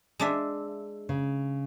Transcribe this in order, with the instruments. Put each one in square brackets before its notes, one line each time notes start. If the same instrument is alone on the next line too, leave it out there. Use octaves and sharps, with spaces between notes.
[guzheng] G#3 D4 E5
[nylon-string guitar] C#3